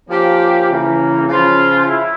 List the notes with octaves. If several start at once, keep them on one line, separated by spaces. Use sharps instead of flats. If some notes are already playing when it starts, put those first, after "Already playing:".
F3 A#3 C#4 G4
C#3 E3 A#3
C#3 F3 C#4 F4
E4